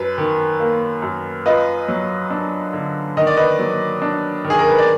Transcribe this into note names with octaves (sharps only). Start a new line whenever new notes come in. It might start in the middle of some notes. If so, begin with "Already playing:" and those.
Already playing: F#2 B4
D#3
A#3
F#2
F4 B4 D#5
F#3
D4
D3
D#3 D#5
D5
B4 D#5
F#3
D4
D#3
G#4
A#4
B4
D5